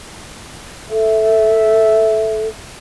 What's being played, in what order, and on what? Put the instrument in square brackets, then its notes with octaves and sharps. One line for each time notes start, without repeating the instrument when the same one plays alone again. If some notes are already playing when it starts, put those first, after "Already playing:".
[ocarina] A4 [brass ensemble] E5